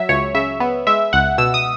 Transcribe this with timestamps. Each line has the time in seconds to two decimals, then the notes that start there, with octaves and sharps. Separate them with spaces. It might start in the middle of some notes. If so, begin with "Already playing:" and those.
Already playing: F#3 E5
0.09 C#2 C#5
0.34 C#3 E5
0.60 B3
0.87 G#3 E5
1.13 C#2 F#5
1.38 B2 E6
1.54 D#6